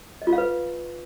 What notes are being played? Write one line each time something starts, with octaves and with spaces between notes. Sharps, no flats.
D#5
F4
F5
B4